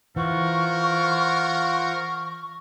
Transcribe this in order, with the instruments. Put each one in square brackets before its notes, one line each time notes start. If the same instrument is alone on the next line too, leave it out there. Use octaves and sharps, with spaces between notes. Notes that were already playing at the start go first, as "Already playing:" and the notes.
[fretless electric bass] E3 [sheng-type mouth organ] F4 C5 F#5 [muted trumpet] A#4 [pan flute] C#6